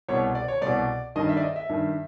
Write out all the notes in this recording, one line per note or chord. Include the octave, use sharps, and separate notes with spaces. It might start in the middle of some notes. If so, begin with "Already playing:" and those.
C2 B2 C#5
D5
C#5
C2 B2 D5
G2 D#3 D#5
E5
D5
D#5
E5
G2 D#3